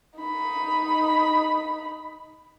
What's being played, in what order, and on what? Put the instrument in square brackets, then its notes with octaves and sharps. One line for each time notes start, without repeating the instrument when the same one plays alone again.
[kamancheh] D#4 B5